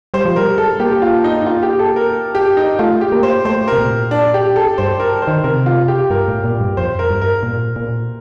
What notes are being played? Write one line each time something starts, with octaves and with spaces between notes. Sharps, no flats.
G3 C5
F3
G3 A#4
A4
A#3 G4
F4
D#4
D#4
F4
G4
A4
A#4
G4
D#4
A3 F4
G4
A#3
C5
A3 C5
A#4
C3
A#2
D4
G4
A4
G2 C5
A#4
C5
D#3
C3 A#4
F4
G4
G2 A#4
A2
A#2
G2
F2 C5
A#4
G2
A#4
A#2
A#2